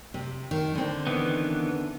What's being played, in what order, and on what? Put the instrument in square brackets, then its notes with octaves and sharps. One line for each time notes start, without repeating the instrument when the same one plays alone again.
[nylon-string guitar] C3
D#3
D3 C4
[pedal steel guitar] D#3 E3 B3